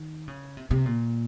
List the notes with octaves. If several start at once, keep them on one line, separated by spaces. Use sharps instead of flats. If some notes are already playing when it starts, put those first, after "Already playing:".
Already playing: D#3
C#3
C3
C3
A#2